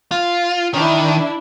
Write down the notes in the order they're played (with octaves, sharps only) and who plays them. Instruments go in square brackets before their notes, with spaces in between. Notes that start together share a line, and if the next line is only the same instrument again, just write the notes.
[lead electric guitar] F4
[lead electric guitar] D#3 [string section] D4 E4